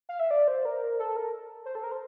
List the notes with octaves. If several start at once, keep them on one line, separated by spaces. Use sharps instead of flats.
F5
E5
D5
C5
A#4
A4
A#4
C5
A4
A#4
C5